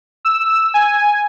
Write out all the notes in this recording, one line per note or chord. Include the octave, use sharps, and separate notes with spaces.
E6
G#5